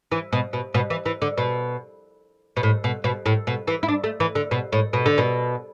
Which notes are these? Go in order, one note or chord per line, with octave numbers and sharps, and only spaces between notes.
E3
B2
B2
B2
E3
E3
D3
B2
B2
A2
B2
B2
A2
B2
E3
E4
D4
A3
E3
D3
B2
A2
B2
D3
B2